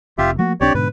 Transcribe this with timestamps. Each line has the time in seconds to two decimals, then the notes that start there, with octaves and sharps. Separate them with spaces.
0.18 F1 F2 F4 G4 E5
0.39 F3 A3 A#3 F#4
0.61 B1 C4 D4 G4 C#5 D5
0.75 G#2 B2 D3 B4